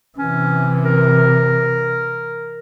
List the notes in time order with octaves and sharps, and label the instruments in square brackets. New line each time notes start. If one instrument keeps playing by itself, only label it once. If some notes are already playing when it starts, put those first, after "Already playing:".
[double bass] C3 E3 [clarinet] C#4
[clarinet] A#4